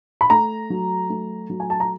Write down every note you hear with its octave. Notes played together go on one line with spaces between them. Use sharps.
B5
A3 A#5
F#3
A3
F#3
G#5
A5
A#5